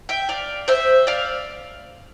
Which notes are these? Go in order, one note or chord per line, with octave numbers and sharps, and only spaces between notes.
E5 G5
D5 F5
C5 E5
D5 F5